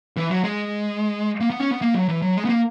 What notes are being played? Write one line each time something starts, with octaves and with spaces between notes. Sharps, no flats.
E3
F#3
G#3
A#3
B3
C#4
B3
A#3
F#3
E3
F#3
G#3
B3
A#3